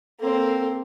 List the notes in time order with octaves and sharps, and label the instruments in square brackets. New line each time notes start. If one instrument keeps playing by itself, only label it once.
[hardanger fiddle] A#3 C4 [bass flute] A4